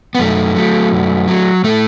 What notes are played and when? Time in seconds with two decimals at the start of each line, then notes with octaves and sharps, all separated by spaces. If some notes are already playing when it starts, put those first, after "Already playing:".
0.15 B3
0.19 F#2 A3
0.56 F#3
0.93 F#2
1.28 F#3
1.64 A2 A3